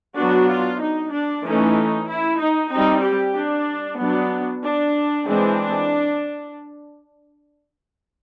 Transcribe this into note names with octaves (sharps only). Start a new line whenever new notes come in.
F#3 B3 D4 F#4
F4
D#4
D4
E3 A3 C#4 D#4
E4
D#4
G3 C4 D#4
G4
D4
F#3 B3 D4
D4
E3 G#3 C4 D4